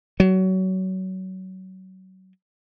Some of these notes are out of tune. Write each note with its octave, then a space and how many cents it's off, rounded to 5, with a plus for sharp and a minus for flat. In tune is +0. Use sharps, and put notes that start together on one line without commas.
F#3 +25